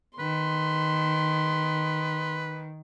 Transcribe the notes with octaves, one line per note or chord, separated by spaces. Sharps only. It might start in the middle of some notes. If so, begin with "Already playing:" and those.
D#3 B4 C6